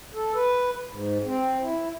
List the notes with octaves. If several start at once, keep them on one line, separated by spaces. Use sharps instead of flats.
A4
B4
G#2
C4
E4